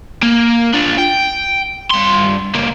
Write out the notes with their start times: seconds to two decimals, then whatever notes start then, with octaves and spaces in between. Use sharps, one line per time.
0.23 A#3
0.74 D4 F4
0.98 G5
1.90 G2 C6
2.55 C#2 A#3